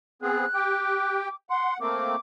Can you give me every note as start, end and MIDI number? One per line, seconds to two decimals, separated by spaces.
0.22 0.46 59
0.22 0.46 60
0.22 0.46 68
0.22 1.19 90
0.54 1.28 67
0.54 1.28 79
0.54 1.35 86
1.50 1.78 78
1.50 1.74 84
1.80 2.16 57
1.80 2.16 58
1.80 2.16 60
1.80 2.13 70
1.80 2.20 86